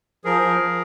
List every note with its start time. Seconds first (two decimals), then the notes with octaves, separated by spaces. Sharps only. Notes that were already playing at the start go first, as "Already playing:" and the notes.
0.24 F3 G#4 A#4
0.41 F3
0.59 F3